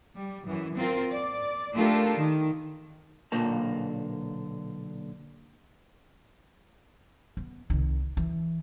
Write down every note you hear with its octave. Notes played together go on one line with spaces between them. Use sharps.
G3
F#2 E3
C4 F4 A#4
D5
A3 D4 F4 G4 A4 A#4
D#3
B1 A#2 D3 A#3 A#4 A5
B3
C2 D#3
E3